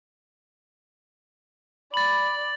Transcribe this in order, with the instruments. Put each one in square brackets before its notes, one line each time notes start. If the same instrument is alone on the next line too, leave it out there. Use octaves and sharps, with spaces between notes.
[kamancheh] D5 [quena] B5 [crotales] A6 F#7